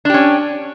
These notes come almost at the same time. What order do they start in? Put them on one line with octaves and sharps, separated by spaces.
D4 G4 C#4